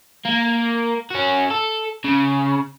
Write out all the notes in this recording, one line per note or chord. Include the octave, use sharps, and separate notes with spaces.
A#3
C#4 F#4
A4
C#3